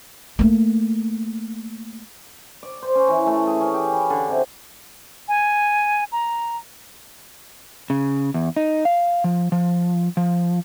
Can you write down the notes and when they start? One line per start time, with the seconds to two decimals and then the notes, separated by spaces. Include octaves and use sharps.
0.39 A3 A#3
2.63 D5
2.83 C5
2.95 C#4
3.08 E3
3.26 A3
3.47 G#4
3.61 C#4
3.74 G4
3.94 B5
4.10 D3
4.29 C3
5.28 G#5
6.12 A#5
7.90 C#3
8.34 E2
8.56 D#4
8.85 F5
9.24 F3
9.52 F3
10.17 F3